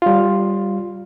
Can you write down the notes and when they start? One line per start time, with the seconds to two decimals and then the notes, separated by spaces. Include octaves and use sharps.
0.02 G3 F4